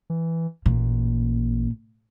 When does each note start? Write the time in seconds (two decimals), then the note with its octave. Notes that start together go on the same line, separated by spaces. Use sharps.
0.10 E3
0.66 A1 A#2